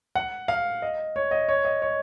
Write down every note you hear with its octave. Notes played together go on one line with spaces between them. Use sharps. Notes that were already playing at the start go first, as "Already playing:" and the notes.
F#5
F5
D#5
C#5
D#5
C#5
D#5
C#5